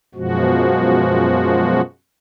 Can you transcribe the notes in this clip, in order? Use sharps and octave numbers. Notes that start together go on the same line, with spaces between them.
F#2 B2 F3 G#3 F#4